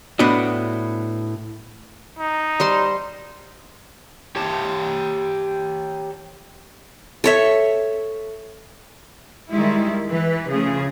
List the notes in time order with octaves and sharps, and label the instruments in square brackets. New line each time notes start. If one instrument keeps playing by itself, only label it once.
[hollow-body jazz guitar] A2 B3 D4 F#4 D#5
[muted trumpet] D#4
[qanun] G3 C5 C6
[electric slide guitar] G4 C#5 A5
[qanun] A4 C#5 E5
[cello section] D#3 G3 G#3 E4
E3 B4
C#3 F3 A3 G#4